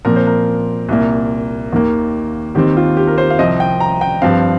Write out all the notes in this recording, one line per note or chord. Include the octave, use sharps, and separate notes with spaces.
A#2 F3 C4 A#4
C5
A#4
C2 A#2 A#3
D#2 D#3 A#3
D#2 D#3 C4 G4
F4
G4
A#4
C5
F5
C2 C3 F3 C4 D#5
G5
A#5
G5
G2 F3 C4 F5